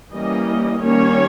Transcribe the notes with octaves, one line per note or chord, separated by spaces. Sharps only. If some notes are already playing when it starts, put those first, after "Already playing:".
E3 G3 A#3 C#4 D#5
D#3 G3 A#3 C#4 C#5